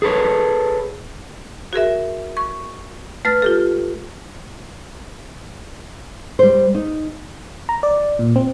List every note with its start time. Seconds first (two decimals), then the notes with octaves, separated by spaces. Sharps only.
0.02 G#4 A4 B4 C#5
1.73 F#4 G#4 A#4 E5
2.37 C#6
3.25 A3 B4 F6 A6
3.42 F4 G4 A4
6.39 G3 C5
6.75 D#4
7.69 A#5
7.83 D5
8.19 A#2
8.36 C4